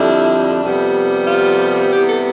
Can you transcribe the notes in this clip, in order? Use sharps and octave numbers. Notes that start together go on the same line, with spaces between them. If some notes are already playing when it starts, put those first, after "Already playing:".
Already playing: F2 D3 G3 D4 E4
F2 C3 G3 B3
F4
C3 E3 G3 B3 G4
A4